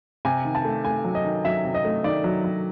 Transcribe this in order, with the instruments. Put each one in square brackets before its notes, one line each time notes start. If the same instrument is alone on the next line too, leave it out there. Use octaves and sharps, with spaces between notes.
[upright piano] C3 G#5
D#3
A5
A3
A3 G#5
F#3
D#5
D#3
F#3 E5
C3
D#5
A3
D#3 D5
F#3
F#3